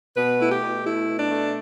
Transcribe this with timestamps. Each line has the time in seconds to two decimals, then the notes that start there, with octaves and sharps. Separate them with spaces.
0.15 B2 B4
0.39 A3 E4
0.51 G4
0.61 B2
0.85 A3 E4
1.08 B2
1.19 D4
1.30 A3